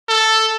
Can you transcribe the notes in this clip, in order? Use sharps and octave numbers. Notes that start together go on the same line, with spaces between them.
A4